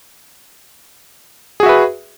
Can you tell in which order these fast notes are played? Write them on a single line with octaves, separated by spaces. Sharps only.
G#4 F#4 E5 B4